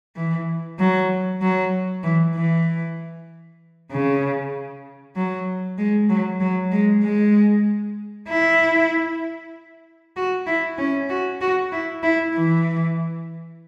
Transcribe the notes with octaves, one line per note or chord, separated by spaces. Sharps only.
E3
F#3
F#3
E3
E3
C#3
F#3
G#3
F#3
F#3
G#3
G#3
E4
F#4
E4
C#4
F#4
F#4
E4
E4
E3